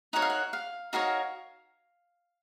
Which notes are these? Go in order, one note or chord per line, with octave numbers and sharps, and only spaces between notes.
D#4 F#4 A#4 C#5 F#5
F5
F#5
F5
D#4 F#4 A#4 C#5 F5